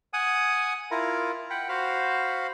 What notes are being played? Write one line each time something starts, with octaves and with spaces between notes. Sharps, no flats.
F#5 G#5 D#6
E4 F4 A#4
F#5 G5 B5
F#4 C5 F5 B5